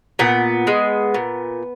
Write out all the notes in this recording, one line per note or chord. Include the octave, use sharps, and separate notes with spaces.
A#2 B3
G#3
A#2